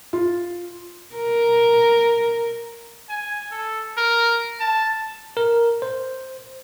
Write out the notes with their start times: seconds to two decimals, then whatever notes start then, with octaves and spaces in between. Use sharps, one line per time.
0.13 F4
1.16 A#4
3.09 G#5
3.52 A4
3.97 A#4
4.60 A5
5.37 A#4
5.82 C5